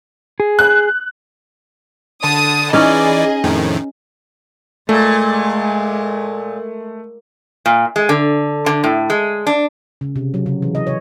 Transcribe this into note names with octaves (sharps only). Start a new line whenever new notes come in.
G#4
F#6
D3 A5 D#6
E3 C#4 D#4 G#4 D5 D#5
F2 A2 D#3
A#2 G#3 A3
A#2
G#3
D3
D3
A2
G#3
D4
C#3
C3
F#3
C#3
E3
D#5
C#5